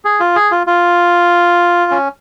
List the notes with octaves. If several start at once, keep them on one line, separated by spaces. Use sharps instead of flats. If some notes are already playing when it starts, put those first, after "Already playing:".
G#4
F4
G#4
F4
F4
C#4